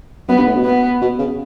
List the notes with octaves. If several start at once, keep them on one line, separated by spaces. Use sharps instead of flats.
F#2 B3
G2
A2
B2
B3
B2
C#3